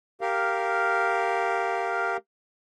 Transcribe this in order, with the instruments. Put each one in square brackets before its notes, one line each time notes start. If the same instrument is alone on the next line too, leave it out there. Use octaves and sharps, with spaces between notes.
[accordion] G4 A#4 F5